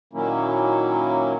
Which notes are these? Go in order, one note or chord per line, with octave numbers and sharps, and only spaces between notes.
A#2 D#3 F#3 A#3 C#4 E4